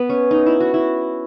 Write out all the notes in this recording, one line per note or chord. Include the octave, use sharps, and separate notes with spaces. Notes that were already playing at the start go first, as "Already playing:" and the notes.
Already playing: B3
C#4
D#4
E4
F#4
E4